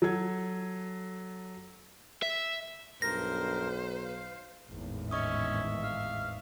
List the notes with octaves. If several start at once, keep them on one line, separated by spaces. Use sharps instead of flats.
F#3 A4 G#6
E5
B1 G2 A#4 C5 A#6
F5
G#1 E2 A2
C#4 D#5 E5 C#6 D#6
F5